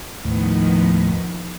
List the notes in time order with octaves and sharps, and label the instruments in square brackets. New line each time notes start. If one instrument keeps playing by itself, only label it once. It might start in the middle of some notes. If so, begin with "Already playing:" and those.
[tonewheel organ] D#2 A2 [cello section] D#3 F3 B3